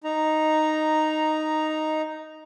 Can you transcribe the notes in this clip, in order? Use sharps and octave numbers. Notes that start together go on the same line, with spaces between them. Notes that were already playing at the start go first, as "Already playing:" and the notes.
D#4 A#5